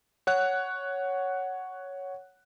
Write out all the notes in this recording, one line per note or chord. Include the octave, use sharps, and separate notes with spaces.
C#5 F#5 F#6